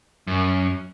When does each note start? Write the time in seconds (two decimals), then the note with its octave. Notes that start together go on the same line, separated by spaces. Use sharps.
0.27 F#2